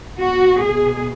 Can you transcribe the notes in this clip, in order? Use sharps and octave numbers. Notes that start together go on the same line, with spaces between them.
B2 F#4
G#4